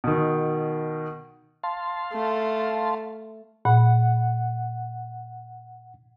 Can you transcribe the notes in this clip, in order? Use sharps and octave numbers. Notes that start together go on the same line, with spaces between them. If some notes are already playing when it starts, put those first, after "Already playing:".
B2 D#3
F5 A5 C6
A3
A#2 F#5